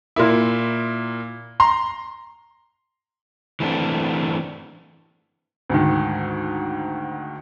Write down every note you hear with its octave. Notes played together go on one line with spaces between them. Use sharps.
A#2 A#3 E4
A#5 C6
E3 A3 C4 D4
D2 G#2 D#3